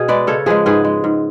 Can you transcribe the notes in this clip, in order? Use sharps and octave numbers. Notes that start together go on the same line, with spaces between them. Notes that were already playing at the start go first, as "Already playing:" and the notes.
Already playing: B2 G#4
G#3 B4 D5
C#3 A4 C#5
F3 G#3 G#4 B4
G#2 G#4 B4
G#3
G#2